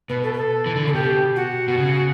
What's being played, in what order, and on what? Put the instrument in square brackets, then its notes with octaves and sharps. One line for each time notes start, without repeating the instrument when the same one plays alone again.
[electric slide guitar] B2 [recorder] B4
[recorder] A4
B4
A4
[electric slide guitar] E3
D3
[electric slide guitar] C#3 [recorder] A4
[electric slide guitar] B2 [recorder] G4
[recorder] F#4
[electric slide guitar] B2
C#3